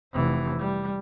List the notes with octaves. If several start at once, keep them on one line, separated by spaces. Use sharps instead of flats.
F1 E3
G3